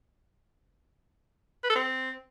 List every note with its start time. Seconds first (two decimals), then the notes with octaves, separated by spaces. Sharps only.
1.64 B4
1.70 A4
1.75 C4